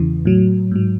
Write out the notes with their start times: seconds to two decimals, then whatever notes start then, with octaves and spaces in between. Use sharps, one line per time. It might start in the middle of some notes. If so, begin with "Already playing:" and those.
Already playing: E2 C#3 E3
0.25 A2 F#3
0.72 G#2 F#3